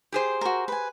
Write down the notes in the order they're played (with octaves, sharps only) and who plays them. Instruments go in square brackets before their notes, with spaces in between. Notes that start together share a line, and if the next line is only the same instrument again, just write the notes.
[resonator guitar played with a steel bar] G4 G#4 C5
[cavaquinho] F#4 A#4
B4 G#5